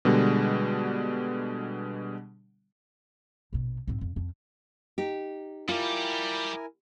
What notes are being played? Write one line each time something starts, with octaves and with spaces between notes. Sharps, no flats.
B2 D3 G3 G#3
A#1 B2
G#2 C4
F2
F2
D#4 G4
G3 E4 F4 G4 A#4 G#5